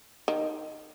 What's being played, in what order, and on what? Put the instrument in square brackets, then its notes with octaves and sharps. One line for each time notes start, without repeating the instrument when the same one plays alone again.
[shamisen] D#3